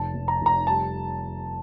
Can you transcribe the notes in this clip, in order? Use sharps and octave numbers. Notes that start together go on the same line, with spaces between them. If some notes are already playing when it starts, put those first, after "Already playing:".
Already playing: F1 A5
F1
A#5
F1 A#5
G3 A5